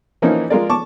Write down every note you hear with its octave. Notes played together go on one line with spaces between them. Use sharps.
E3 F3 A#3 C#4 D#4
G#3 F4 A#4 D5
A5 C#6 D6